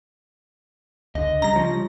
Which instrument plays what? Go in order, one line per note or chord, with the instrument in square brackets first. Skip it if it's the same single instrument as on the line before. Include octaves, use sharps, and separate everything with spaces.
[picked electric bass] C#2 D3 [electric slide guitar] D#5
[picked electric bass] C#3 G3 [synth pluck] A#5 A#6
[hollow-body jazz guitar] F3 C#4